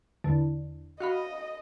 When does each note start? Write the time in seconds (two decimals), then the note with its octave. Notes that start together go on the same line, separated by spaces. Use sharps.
0.24 E2 D3
1.00 F#4 D#5 F5 B5